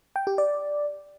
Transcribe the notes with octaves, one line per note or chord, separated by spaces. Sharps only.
G5
G4
D5